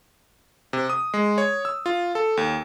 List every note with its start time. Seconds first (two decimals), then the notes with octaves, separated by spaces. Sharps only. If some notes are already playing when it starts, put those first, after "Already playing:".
0.73 C3
0.90 D#6
1.14 G#3
1.38 C#5
1.65 E6
1.86 F4
2.15 A4
2.37 D#2